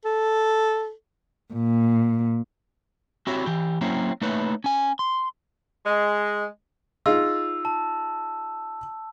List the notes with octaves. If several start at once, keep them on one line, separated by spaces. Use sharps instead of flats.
A4
A#2
C4 E4 F#4 G4 C#5 E5
E3 G4
F#3 A#3 C4 C#4 E4
A3 A#3 D#4 E4 B4 C#5
C#4 G#5
C6
G#3
D#4 F4 G#4 E6
A5